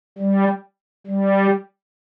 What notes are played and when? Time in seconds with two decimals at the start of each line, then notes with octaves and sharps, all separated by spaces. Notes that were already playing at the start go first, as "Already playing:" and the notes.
0.18 G3
1.07 G3